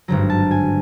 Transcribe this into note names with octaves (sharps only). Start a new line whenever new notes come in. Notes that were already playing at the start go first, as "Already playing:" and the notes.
G#1 G2 D3 F#3 A#5
A5
G#5